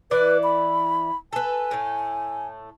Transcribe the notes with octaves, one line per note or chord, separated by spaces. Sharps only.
E3 E4 B4 D5
B5
A4 B4 G#5
A2 A3